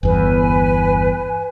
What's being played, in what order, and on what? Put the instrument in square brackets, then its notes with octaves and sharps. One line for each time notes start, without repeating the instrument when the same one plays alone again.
[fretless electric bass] G1 E2 [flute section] B4 G#5